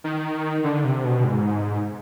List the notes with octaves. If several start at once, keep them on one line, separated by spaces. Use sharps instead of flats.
D#3
D3
C3
B2
G#2